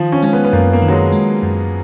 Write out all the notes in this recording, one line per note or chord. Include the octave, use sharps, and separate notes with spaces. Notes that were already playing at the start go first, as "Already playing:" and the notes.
Already playing: D#3 F3
C#4
G#3 C#4
B3
B3
F#2 A#3
A#3
D#3
F#3
G#3
G#3
F#2